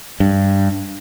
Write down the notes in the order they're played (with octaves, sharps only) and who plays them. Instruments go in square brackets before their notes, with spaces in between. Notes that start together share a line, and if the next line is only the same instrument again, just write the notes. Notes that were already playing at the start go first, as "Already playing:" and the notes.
[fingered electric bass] G2